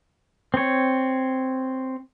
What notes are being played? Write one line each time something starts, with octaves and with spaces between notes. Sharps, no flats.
C4 C#5